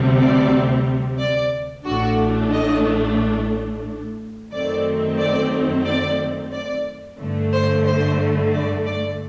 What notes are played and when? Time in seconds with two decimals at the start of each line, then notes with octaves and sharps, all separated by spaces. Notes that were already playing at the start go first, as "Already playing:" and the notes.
Already playing: D2 C3 G3 C4
0.18 D5
1.18 D5
1.85 A1 A2 A3 D4 F#4
2.52 D#5
4.52 F#2 D#3 A3 C4 D5
5.19 D5
5.85 D5
6.52 D5
7.19 G2 D3 A3
7.52 C5
7.85 C5
8.52 D5
8.85 D5